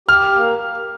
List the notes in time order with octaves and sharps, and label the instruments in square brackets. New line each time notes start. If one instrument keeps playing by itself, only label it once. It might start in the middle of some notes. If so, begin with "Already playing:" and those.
[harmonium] G4 [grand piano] F6
[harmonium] A#3